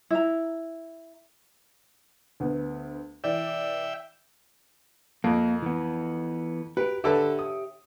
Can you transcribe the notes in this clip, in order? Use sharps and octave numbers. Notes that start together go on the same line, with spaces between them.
E4 A#5
D2 B3
E3 D5 E5 G5
F2 A#3
E3 B3
F#4 G4 A#4 B4
D3 G4 A4 B4 C#5 E5
D#6